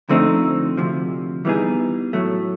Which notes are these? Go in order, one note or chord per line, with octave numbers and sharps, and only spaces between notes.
D3 F3 A3 C4 D#4
D2 C3 F3
E3 G3 B3 D#4 G#4
A2 F#3 A3